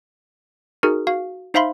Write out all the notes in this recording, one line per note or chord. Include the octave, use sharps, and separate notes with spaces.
D#4 F#4 G#4 A#4
F#4 F5
D#4 C5 E5 F5 B5 C6